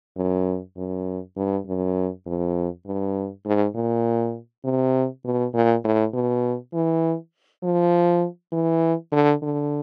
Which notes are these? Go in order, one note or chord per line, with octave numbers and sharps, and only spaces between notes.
F#2
F#2
G2
F#2
F2
G2
G#2
A#2
C3
B2
A#2
A2
B2
E3
F3
E3
D3
D3